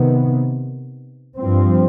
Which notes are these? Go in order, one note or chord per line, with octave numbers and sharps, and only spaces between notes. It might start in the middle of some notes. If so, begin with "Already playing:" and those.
Already playing: C3 D#3 B3
G2 F3 C4